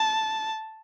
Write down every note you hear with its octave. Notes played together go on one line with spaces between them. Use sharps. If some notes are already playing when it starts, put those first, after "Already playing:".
Already playing: A5